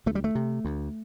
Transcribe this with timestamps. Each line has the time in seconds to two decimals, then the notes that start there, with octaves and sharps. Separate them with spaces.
0.06 D2 A3
0.15 G3
0.24 A3
0.35 C3
0.65 D2